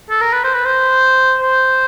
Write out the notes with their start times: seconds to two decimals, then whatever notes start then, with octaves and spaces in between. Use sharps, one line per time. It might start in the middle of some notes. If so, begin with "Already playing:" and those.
0.10 A4
0.21 A#4
0.33 B4
0.44 C5
0.54 B4
0.66 C5
1.41 C5